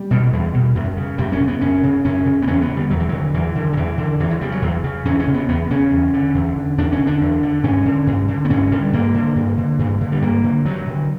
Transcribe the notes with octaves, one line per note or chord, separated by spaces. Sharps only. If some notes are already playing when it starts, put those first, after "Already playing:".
Already playing: G3
B2
E2
B2
F#2
C#3
F#2 G3
C#4
C#3
B3
F#2 C#4
C#3
F#2 C#4
C#3
B3
E2 C#4
B3
D3
G3
E2 F#3
E3
D3 F#3
E2 E3
D3
F#3
E2 E3
D3
E2 E3
F#3
C#3 G3
F#3
E2
C#3
E2 C#4
C#4
C#3
B3
E2 B3
C#3 C#4
E2
D3
E2
D3
E2 D4
C#4
D3
D4
E2
D3
G2 C#4
D3
G2
D3
B3
G2 C#4
D3 G3
G2 A#3
D3
G2
D3
G2
D3
G3
G2 A#3
D3
G2 F#3
D3